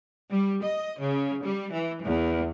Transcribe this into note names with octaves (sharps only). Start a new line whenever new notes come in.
G3
D#5
C#3
G3
E3
E2